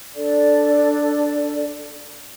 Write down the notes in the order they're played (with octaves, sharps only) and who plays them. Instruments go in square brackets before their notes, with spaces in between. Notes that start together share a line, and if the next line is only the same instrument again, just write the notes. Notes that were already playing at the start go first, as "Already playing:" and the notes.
[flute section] D4 A4 D5